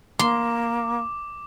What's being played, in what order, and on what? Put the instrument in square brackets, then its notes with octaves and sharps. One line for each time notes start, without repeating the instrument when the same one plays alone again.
[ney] A#3 [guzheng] C6 [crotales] D6